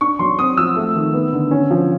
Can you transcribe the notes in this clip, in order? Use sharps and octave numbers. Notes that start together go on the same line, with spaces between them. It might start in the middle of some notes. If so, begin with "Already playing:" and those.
D4 C#6
F#3 C6
C4 D#6
F3 E6
A3
D#3
B3
D3
C#4
F3